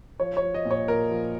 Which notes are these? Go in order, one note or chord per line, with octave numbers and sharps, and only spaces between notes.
F3 C#5
C#5
F3
D#5
A#2
C#5
A#2 A#4
F3